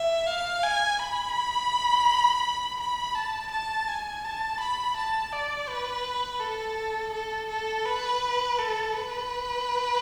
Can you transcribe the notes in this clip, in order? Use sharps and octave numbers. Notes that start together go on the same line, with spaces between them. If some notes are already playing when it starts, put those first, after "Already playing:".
Already playing: E5
F5
G#5
B5
B5
A5
A5
G#5
A5
B5
A5
D5
B4
A4
A4
A4
B4
A4
B4